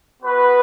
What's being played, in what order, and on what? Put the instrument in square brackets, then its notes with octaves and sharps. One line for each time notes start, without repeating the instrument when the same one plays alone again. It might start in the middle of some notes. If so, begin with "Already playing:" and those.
[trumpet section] B3 F#4 B4